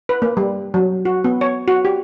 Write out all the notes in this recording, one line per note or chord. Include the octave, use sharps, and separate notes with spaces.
B4
A#3
G3
F#3
F#4
B3
C#5
F#4
G4